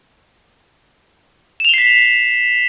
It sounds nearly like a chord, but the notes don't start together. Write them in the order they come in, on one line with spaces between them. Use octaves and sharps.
E7 F7 G7 C7 B6